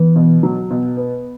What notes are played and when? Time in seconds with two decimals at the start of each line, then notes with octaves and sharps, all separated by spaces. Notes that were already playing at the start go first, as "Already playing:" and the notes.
Already playing: E3 B3
0.16 B2
0.43 F#3
0.70 B2
0.97 B3